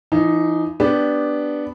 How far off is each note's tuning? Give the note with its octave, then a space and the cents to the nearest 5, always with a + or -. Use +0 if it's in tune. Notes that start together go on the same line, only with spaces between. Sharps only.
E3 +40 D#4 +0
B3 +0 D4 +0 G4 -5